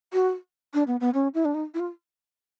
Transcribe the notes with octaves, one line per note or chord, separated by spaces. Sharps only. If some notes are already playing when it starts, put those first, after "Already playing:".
F#4
D4
B3
B3
C#4
E4
D4
D#4
E4
F4